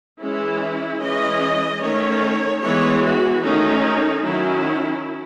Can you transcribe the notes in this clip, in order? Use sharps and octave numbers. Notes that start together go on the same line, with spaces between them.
E3 G#3 C#4 E4
E3 G#3 C#4 D#5
D#3 A3 C#4 C#5
E3 G#3 B3 C#5
F#4
D#3 A3 C#4 D#4
D#3 F#3 C#4 E4